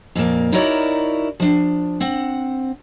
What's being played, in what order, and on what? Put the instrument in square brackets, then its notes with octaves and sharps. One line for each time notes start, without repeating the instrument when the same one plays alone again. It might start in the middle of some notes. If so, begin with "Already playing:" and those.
[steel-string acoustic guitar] F2 A#2 A#3
D#4 E4 F#4 A#4 C#5 D5
F3 D4
C4 F#5